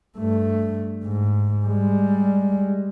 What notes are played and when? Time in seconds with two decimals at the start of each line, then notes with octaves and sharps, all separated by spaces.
0.18 G2 A3
1.04 G#2
1.66 G3 G#3